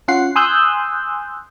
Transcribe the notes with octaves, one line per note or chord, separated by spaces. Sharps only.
C#4 F4 F#5 C7
G#5 C6 D#6 E6 F#6 G6